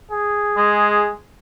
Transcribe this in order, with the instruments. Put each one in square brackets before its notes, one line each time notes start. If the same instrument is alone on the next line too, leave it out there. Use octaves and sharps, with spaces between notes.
[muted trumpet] G#4
[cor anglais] G#3